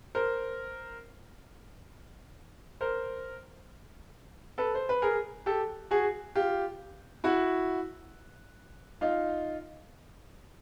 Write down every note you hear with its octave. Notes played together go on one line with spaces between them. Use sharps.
A#4 C5
A#4 C5
A4 B4
C5
B4
G#4 A#4
G4 A4
F#4 G#4
F4 G4
E4 F#4
D#4 F4